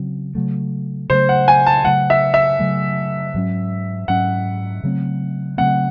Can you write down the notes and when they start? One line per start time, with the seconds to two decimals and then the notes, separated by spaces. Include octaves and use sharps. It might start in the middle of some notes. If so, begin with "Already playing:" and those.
Already playing: C#3 F#3 C4
0.35 C#3 F#3 A3
1.10 C#3 F#3 A3 C5
1.29 F#5
1.48 G#5
1.67 A5
1.84 C#3 F#3 A3 F#5
2.10 E5
2.34 E5
2.59 C#3 F#3 A3
3.34 G#2 F#3 C#4
4.08 G#2 F#3 C#4 F#5
4.83 C#3 F#3 A3 C4
5.58 C#3 F#3 A3 C4 F#5